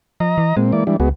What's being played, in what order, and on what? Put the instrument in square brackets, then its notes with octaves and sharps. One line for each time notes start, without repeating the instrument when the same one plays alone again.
[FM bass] F3 [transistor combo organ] D#5 A#5
[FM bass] E3
[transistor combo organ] A#2 C4 [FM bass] G#3
[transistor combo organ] E3 A#3 D5
E3 G3 D4
[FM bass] C#2 [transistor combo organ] G#3 B3 F#4